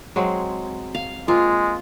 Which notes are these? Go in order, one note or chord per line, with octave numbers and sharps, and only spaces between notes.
F#3 G#3 C4
F5
G#3 A#3 C4 F4